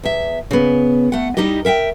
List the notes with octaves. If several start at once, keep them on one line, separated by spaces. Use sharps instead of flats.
E2 E5
C#3 B3
A3 F#5
G3 D#4 E4 G4 D#5
A#4 E5 F#5 G5